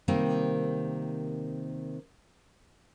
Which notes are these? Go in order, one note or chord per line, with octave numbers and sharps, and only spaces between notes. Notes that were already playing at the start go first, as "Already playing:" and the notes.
C3 D#3 G3 A#3 C4